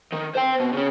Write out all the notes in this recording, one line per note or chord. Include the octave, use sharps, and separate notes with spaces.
D#3
C5 G5
B2
C#3 C#4